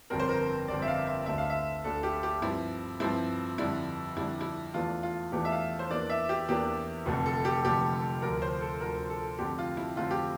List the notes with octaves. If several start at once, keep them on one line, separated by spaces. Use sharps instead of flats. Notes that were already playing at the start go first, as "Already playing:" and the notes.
G1 F2 D3 G3 C4 A#4
C5
A#4
G1 F2 D3 G3 C4 D5
E5
F5
E5
D2 D3 A3 D4 E5
F5
E5
D2 D3 A3 D4 A4
G4
G4
G2 F3 C4 E4
G2 F3 C4 E4
F2 D3 G3 D4 E4
F2 D3 G3 D4 E4
E4
E2 E3 A3 D4 F4
F4
E2 E3 A3 D4 G4
E5
F5
C5
E2 E3 A#3 D4 D5
E5
G4
E2 E3 A#3 D4 G4
F1 F2 D3 F3 A3
A4
G4
F1 F2 D3 F3 A3 G4
D2 D3 F3 A#4
C5
A4
D2 D3 F3 A#4
A4
F2 D3 A3 C4 G4
F4
E4
F2 D3 A3 C4 F4
G4